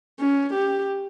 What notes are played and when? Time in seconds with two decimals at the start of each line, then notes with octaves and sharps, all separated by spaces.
0.19 C#4
0.53 G4